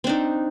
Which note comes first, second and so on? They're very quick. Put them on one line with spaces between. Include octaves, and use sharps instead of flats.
C4 D4 D#4